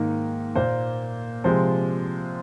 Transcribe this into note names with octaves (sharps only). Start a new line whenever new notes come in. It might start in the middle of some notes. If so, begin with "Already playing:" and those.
Already playing: G#2 D#3 A#3
A#2 A#3 C5
C3 F3 G#3 C5